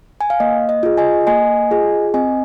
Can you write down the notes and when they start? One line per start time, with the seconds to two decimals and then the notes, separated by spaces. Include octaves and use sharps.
0.21 G#5
0.30 F5
0.40 A#3 D#5
0.69 D#5
0.83 F4 G#4
0.97 D#5 G#5
1.27 A#3 D#5 G#5
1.71 F4 G#4
2.14 C4 D#5 G#5